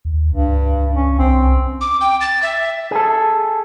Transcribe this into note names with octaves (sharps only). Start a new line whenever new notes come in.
D#2
C#2 G2
C#4
C2 C4
D6
G5
A6
E5
G#4 A4